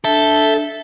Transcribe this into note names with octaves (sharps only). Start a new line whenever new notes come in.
D4 A4 E5 G6